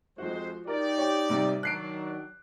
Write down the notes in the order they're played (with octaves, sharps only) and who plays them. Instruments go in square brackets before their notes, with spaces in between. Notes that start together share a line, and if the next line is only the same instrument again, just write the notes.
[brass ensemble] F2 G#3 C5 [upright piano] F3 F#4
[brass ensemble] D#4 G4 D5 [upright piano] A#4
[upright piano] C#5 G5
G#2 C3 G3
[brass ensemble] D#3 F#3 D4 [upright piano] F#6 C7 D7